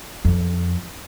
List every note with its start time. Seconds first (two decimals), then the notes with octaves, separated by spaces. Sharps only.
0.25 F2